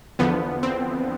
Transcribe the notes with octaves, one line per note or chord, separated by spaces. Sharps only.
E2 D3 F3 B3
C4